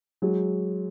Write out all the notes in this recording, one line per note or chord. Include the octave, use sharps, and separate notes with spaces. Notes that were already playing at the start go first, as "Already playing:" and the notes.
F#3 G#3